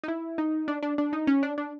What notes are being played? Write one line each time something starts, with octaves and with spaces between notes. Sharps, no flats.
D#4
E4
D#4
D4
D4
D4
D#4
C#4
D4
D4